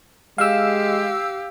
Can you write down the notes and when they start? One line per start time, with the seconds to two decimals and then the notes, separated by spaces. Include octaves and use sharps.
0.38 G#3 G4 F5 E6